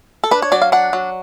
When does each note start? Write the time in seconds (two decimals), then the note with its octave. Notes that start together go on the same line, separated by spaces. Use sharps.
0.24 A4
0.31 D4 B4
0.42 C#5
0.52 F#3 D5
0.62 F5
0.72 D4 F#5
0.93 F#3